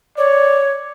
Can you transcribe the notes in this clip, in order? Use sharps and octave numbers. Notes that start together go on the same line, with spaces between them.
C#5 D5